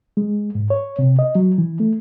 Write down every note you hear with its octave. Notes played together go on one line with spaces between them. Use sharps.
G#3
G#2
C#5
C3
D#5
F#3
E3
A3